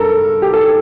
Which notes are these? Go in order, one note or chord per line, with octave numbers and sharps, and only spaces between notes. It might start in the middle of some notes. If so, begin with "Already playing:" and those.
Already playing: G2 A4 A#4
G4
A4